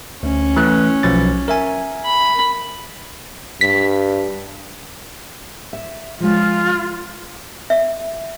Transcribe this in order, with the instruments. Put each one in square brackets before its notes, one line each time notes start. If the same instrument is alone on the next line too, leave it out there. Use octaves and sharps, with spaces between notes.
[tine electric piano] D2 [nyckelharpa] C#4
[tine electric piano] E3 A3 F#6
B1 F3 A6
A#4 E5 G#5
[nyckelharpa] B5
[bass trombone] G2 [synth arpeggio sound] B6
[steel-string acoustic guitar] E5
[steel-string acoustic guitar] F3 G#3 [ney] F4
[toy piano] E5